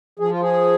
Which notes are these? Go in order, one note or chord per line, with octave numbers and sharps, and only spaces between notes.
F3 G#4
F4
G#4